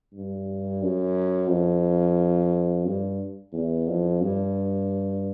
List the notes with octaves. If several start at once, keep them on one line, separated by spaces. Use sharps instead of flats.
G2
F#2
F2
G2
E2
F2
G2